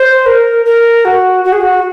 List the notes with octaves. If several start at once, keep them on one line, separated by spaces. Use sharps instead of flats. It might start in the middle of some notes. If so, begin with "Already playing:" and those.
Already playing: C5
A#4
A#4
F#4
F#4
G#4
F#4